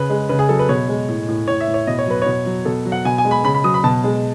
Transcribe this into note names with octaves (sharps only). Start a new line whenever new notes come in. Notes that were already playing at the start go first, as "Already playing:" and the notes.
Already playing: C#3 B4
G#3
C#3 B4
G#4
F#3 A4
B4
B2 C#5
G#3
A2
A2
A2 C#5
E5
A2
C#5
B2 D#5
C#5
F#3 B4
B2 C#5
F#3
B2 A4
F#3
F#5
B2 G#5
G#5
G#3
B5
C#3 B5
B5
F#3 D#6
B5
B2 A5
G#3